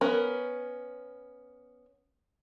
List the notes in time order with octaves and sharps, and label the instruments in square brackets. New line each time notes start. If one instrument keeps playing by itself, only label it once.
[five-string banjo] B3 C#4 A#4